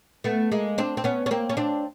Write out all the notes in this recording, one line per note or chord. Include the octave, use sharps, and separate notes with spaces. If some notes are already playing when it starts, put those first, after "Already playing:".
A3 B3
G#3 A#3
C4 D4
C4
B3 C#4
C#4
A#3 C4
C#4
C4 D4